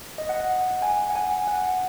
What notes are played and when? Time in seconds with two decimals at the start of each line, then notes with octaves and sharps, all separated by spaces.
0.18 D#5
0.29 F#5
0.40 F#5
0.82 G#5
1.10 F#5
1.16 G#5
1.47 F#5